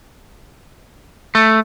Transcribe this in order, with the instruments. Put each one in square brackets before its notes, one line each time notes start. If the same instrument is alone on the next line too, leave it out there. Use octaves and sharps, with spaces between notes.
[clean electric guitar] A3